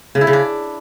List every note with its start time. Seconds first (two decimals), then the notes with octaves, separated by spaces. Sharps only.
0.15 C#3
0.21 E4
0.27 C#3
0.33 D4